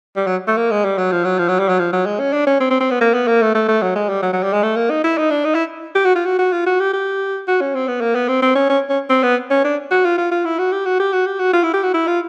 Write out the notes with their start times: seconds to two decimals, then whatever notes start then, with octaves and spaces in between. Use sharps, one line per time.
0.17 G3
0.27 F#3
0.48 A3
0.58 A#3
0.71 G#3
0.85 G3
0.98 F#3
1.12 F3
1.25 F#3
1.39 F3
1.49 F#3
1.59 G3
1.69 F#3
1.79 F3
1.93 F#3
2.06 G#3
2.20 C#4
2.33 D4
2.47 C#4
2.60 C4
2.71 C4
2.81 C4
2.91 B3
3.01 A#3
3.14 B3
3.28 A#3
3.42 A3
3.55 A3
3.68 A3
3.82 F#3
3.96 G#3
4.09 G3
4.23 F#3
4.33 F#3
4.43 G3
4.53 G#3
4.63 A3
4.77 A#3
4.90 D#4
5.05 E4
5.18 D#4
5.31 D4
5.45 D#4
5.55 E4
5.95 G4
6.05 F#4
6.16 F4
6.26 F#4
6.39 F#4
6.53 F4
6.66 F#4
6.80 G4
6.94 G4
7.48 F#4
7.61 C#4
7.75 C4
7.88 B3
8.01 A#3
8.15 B3
8.29 C4
8.42 C4
8.56 C#4
8.70 C#4
8.90 C#4
9.10 C4
9.23 B3
9.50 C#4
9.64 D4
9.91 F#4
10.05 F4
10.18 F4
10.32 F4
10.45 E4
10.59 F#4
10.72 G4
10.86 F#4
11.00 G4
11.13 F#4
11.26 G4
11.39 F#4
11.53 F4
11.63 E4
11.74 G4
11.83 F#4
11.94 E4
12.07 F4